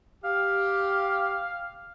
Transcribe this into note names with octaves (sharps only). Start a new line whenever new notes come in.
G4 F5